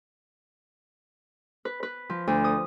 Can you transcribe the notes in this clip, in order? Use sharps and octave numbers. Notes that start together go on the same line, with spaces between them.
B4
B4
F3
D2
D#6